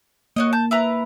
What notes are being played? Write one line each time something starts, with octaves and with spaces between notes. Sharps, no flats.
A#3 F#4 C#5 D#5
A5 G6
E4 B4 A#5